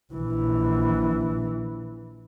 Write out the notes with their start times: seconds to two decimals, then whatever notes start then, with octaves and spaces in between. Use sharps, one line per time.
0.13 A#1 E3